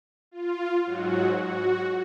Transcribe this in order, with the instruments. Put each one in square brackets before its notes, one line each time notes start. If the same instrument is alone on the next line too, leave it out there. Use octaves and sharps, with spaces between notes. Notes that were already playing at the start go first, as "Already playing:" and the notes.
[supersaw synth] F4
G#2 F#3 F#4
F#4